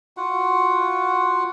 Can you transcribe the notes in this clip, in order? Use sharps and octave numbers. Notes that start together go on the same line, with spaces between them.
F4 F#4 F#5